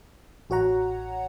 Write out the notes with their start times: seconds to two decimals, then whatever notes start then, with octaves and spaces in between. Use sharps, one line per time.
0.50 A1 F#4 C#5 F#5 A#5